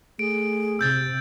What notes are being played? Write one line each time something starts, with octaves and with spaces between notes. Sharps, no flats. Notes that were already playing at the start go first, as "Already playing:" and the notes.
A3 G#4 D7
C3 E6 G6 A6